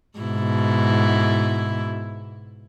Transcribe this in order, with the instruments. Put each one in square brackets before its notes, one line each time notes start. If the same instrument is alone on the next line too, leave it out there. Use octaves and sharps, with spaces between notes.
[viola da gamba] G#2 B2 E4